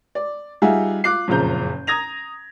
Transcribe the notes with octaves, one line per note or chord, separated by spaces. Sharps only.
D5
G3 D#4 F4 G#4 E5 F#5
F4 D6 F#6 C7
F#1 F2 A#2 C#3 A#5 G6
A#5 D#6 G#6 A#6 F7